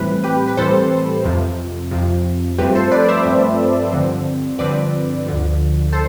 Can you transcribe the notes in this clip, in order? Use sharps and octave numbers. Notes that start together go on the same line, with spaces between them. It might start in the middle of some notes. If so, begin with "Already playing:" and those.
Already playing: A2 E3 G3 C4 B4
G4 B4
B4
A2 E3 G3 C4 A4 C5
F2 C3 F3
F2 C3 F3
G2 F3 A3 C4 G4 B4
A4 C5
B4 D5
D5
C5 E5
G2 F3 A3 C4
G2 D3 F3 C4
G2 D3 F3 C4 B4 D5
D2 D3 F3
A4 C5